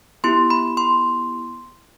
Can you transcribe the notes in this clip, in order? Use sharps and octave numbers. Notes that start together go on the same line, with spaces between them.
B3 E4 G4 C6
B5
C6